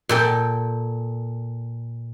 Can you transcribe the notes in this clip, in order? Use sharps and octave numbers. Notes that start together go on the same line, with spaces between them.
A#2 A4 G5